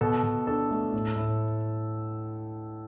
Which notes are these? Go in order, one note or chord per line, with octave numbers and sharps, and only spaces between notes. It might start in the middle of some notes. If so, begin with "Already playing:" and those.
B2 A4
B2
D4 A4
A3
A2
A2